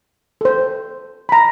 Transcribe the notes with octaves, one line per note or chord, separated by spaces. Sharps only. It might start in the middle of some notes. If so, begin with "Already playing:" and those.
A4 C5
A#5 B5